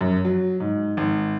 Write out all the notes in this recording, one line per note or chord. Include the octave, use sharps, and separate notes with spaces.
F#2
F#3
G#2
G#1